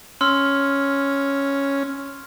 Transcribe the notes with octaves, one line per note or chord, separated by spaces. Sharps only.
C#4 C6 E6 F6